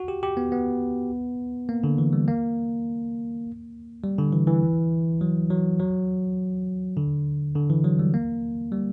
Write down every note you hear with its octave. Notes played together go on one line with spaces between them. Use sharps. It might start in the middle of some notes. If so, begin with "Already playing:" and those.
Already playing: F#4
G4
G4
B3
B3
A#3
D3
E3
G3
A#3
G3
D3
E3
E3
F#3
F#3
F#3
D3
D3
E3
F#3
G3
A#3
G3